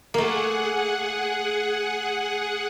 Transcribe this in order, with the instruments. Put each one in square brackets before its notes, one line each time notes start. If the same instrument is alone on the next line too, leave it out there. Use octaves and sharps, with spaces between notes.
[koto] A3 A#3 [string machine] G#4 F#5